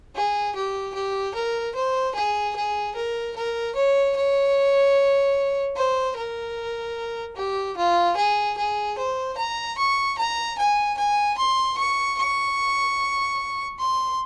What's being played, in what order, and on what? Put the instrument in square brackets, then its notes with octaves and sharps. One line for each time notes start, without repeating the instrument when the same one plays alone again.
[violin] G#4
G4
G4
A#4
C5
G#4
G#4
A#4
A#4
C#5
C#5
C5
A#4
G4
F4
G#4
G#4
C5
A#5
C#6
A#5
G#5
G#5
C6
C#6
C#6
C6